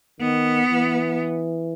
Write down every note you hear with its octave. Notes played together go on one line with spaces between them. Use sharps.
D#3 B3
E3